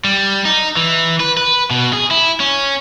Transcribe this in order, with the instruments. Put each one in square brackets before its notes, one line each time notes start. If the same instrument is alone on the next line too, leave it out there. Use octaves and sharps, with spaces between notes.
[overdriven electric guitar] G3
D#4
E3
B4
B4
B2
G#4
E4
C#4